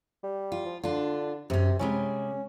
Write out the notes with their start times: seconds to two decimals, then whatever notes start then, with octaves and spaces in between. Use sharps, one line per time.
0.23 G3
0.52 F4
0.65 F3
0.84 D3 D4 F4
1.50 F#2 C3 C#4
1.79 C3 G3 G#3 C#4